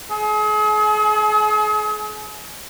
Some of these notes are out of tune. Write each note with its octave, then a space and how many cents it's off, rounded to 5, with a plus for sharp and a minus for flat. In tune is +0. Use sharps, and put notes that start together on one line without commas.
G#4 +40